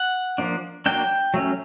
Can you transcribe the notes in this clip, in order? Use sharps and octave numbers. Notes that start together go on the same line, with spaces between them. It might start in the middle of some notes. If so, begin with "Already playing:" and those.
Already playing: F#5
F3 A#3 D4
F#3 A#3 D4 G5
F#3 A3 C#4